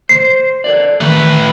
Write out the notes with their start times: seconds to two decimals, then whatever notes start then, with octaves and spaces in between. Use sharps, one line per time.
0.09 C5 C7
0.64 A4 A#4 D5
1.01 D#3 A3 B4